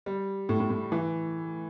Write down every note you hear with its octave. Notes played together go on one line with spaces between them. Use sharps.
G3
A2
A2
A2
E3